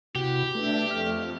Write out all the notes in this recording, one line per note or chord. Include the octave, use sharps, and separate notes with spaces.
C3 E4 F#4 G4
A3 D4 B4 E5
F2 A3 F6